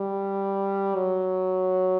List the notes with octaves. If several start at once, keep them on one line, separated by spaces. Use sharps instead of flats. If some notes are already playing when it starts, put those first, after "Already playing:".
Already playing: G3
F#3